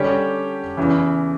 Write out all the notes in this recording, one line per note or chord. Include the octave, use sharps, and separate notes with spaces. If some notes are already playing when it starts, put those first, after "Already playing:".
Already playing: D3 G3 C#4 G4
E2 C#3 E3